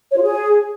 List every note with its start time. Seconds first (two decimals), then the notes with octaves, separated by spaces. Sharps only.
0.11 C#5
0.17 F4
0.23 G#4